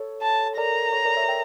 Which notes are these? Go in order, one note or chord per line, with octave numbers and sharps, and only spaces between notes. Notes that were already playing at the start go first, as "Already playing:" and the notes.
Already playing: A4 C#5
A5
A#4 D5 A#5
A4 C#5
A#4 D5
C#5 E5
E5 G5